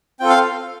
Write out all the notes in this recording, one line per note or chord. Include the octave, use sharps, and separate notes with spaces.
C4 F4 A4 G5
F5